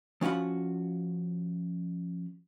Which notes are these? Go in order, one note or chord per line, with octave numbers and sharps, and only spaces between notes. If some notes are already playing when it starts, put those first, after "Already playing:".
F3 C#4 F4 F#4 B5